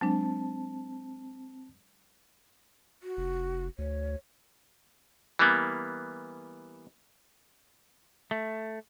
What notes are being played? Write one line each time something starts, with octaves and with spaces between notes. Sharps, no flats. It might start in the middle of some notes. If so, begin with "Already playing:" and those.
F#3 G#3 C4 D4 A5
F#4
F1
D2 C#5
E3 G3 A#3 B3
A3